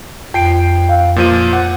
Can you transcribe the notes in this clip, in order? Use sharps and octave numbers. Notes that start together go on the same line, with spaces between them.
F2 G5 C7 D7
F5
A#2 F3 D#7
F#5